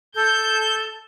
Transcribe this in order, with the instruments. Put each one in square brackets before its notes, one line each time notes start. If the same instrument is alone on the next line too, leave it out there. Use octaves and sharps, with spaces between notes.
[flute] A4 [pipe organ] G6